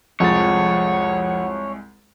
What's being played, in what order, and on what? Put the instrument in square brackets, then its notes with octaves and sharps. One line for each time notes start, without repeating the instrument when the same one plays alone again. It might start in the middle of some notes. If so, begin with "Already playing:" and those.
[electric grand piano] C2 G#3 A6 [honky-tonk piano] F2 [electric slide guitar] C#5 [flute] F#5